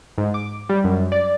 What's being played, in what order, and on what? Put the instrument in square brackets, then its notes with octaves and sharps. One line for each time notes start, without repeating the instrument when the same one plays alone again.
[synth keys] G#2
D6
G3
F#2
D5